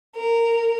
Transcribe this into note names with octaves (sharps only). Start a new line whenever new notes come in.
A#4